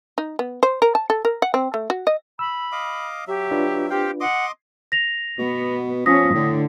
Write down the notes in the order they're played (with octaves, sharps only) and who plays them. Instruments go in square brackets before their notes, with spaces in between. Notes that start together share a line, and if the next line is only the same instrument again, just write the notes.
[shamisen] D#4
B3
C5
A#4
A5
A4
A#4
F#5
C4
A3
F#4
D#5
[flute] B5 [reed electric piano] E6
[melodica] D#5 F5 D6
[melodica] F#3 E5 [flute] G4
[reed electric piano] D4 F4 B4
[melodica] C4 F5 G5 [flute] G4
[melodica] D#5 C6 D6 [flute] F#5
[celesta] A#6 F7
[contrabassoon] B2 [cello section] B3
[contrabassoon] F3 [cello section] C#4 [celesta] D#6 A#6 B6
[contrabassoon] A2 [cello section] D3